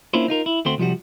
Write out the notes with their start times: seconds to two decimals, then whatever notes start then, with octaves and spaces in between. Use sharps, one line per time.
0.14 A#3 C#4 D4 E4 F4 C5
0.28 D#4 F4 A#4
0.46 E4
0.65 D2 A3 C4 F#4 C6
0.78 C2 F3 G3 F#4